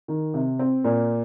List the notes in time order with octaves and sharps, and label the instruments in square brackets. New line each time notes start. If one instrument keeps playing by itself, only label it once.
[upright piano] D#3
C3
C4
A#2